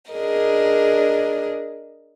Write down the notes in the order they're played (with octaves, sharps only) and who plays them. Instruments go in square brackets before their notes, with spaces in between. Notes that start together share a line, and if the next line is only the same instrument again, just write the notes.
[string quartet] D4 G#4 A#4 D#5